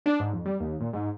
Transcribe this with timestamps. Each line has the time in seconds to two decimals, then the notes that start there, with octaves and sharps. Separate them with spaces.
0.06 D4
0.20 G#2
0.33 F2
0.46 G3
0.60 D#2
0.80 A#2
0.93 G#2